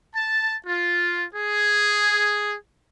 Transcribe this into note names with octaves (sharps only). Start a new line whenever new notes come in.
A5
F4
G#4